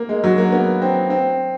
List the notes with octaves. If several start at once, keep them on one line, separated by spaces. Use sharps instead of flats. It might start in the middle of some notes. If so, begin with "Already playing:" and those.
Already playing: A#3
G#3
F#3
A#3
B3
C4
C4